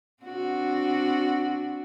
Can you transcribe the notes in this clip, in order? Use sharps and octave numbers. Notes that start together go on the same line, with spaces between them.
C4 D4 F#4